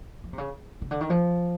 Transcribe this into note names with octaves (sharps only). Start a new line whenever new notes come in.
F3
C3
C#3
C#3
D3
D#3
F3